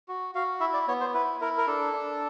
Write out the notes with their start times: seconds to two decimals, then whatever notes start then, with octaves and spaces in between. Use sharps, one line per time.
0.08 F#4
0.35 F#4 F5
0.60 E4 E5
0.74 D5
0.88 B3 C#5
1.01 C5
1.14 E4 B4
1.41 E4 A#4
1.57 A#4
1.67 D4 A4
1.93 D4